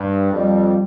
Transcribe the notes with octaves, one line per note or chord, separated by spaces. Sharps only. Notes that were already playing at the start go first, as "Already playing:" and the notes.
Already playing: G2
F2 G3